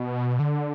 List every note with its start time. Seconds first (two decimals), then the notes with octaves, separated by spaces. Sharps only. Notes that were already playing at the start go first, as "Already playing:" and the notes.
Already playing: B2
0.39 D3